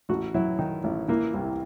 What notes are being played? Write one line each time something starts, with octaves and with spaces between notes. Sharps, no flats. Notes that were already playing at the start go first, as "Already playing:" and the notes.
A1 F#4
F#3 E4
D#3 D#4
A1
E3 A#3
C2